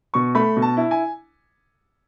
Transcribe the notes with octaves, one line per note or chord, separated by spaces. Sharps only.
B2 C#6
A3 B5
B2
A5
E4
G#5